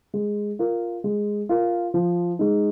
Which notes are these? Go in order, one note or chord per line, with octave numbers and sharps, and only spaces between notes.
G#3
F4 A#4
G#3
F4 A#4
F3
G#3 D#4